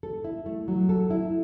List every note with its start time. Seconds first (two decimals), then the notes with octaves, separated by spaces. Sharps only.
0.03 A4
0.24 E4
0.46 A3
0.68 F#3
0.89 A4
1.10 E4